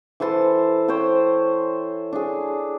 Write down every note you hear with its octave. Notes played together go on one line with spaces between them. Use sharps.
E3 A4 C5 A5
C5 C#5 G5 A5
D4 G#4